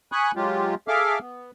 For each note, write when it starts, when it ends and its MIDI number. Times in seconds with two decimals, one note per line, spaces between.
0.12 0.32 80
0.12 0.32 83
0.12 0.32 85
0.12 0.32 87
0.12 0.32 90
0.36 0.75 54
0.36 0.75 56
0.36 0.75 65
0.36 0.75 67
0.88 1.19 68
0.88 1.19 69
0.88 1.19 76
0.88 1.19 77
0.88 1.19 86
0.88 1.19 89
1.20 1.51 59